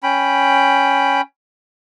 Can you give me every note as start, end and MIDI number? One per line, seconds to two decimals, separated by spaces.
0.03 1.21 61
0.03 1.21 79
0.03 1.21 83